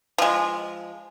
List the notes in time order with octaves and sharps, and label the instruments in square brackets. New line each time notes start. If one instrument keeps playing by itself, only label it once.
[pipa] F3 G#3